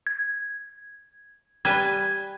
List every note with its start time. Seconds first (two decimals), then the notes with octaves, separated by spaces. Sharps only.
0.07 G#6
1.65 G3 B4 G#5 G#6